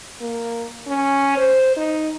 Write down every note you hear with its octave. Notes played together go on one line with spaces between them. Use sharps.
A#3
C#4
C5
D#4